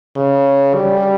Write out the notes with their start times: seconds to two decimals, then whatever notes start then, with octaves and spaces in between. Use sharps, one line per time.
0.17 C#3
0.75 G3